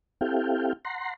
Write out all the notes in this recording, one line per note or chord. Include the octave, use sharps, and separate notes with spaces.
C4 E4 G4 A4 F5 G5
F#5 A#5 C6